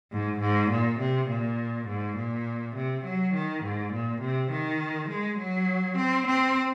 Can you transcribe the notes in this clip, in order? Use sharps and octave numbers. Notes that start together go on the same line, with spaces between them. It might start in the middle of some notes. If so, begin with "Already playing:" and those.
G#2
G#2
A#2
C3
A#2
G#2
A#2
C3
F#3
D#3
G#2
A#2
C3
D#3
G#3
F#3
C4
C4